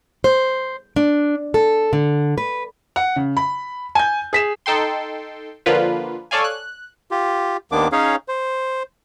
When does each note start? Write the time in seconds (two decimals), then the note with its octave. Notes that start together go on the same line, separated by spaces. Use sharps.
0.24 C5
0.96 D4
1.54 A4
1.93 D3
2.38 B4
2.96 F#5
3.16 C#3
3.37 B5
3.95 G#5 G6
4.33 G#4 B6 E7
4.66 D#4 A4 G5 C6
5.66 D3 F3 A#3 F4 B4
6.31 A4 C#5 D5 F5 G#5
6.44 F#6
7.11 F4 G4
7.72 D#2 D#3 A#3 B3 D4 D6
7.92 C#4 D#4 G#4 C#5 F5
8.28 C5